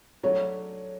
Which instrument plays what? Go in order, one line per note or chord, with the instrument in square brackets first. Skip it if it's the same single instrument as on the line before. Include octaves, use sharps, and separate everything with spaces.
[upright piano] F#3 A3 D4 F#4 [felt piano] C#5